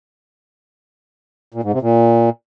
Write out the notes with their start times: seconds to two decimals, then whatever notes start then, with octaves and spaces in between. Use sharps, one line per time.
1.54 A#2
1.64 G#2
1.73 C3
1.82 A#2